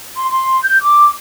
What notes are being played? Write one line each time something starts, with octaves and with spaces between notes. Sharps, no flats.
C6
C6
G6
D6